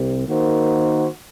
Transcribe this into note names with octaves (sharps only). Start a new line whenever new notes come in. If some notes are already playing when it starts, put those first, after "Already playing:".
Already playing: C2 C3
D#3 A#3 D#4 F#4 C5